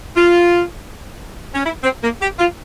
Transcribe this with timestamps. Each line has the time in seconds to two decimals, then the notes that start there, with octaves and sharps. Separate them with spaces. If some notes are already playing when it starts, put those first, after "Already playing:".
0.16 F4
1.54 C#4
1.65 E4
1.84 C4
2.03 A#3
2.21 G4
2.39 F4